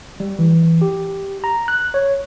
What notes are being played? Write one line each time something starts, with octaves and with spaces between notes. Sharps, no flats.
G3
E3
G4
A#5
F#6
C#5